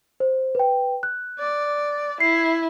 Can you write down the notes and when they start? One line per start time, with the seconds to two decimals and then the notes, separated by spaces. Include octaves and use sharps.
0.20 C5
0.55 B4 G5
1.03 F#6
1.39 D5
2.20 E4 C7